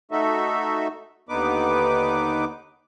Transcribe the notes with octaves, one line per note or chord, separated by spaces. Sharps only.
A3 D#4 F#4 A4 E5
D#2 D3 B3 D#4 B4 D6